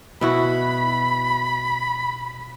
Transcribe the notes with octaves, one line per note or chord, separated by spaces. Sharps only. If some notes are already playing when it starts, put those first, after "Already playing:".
B2 E4 F#4 B5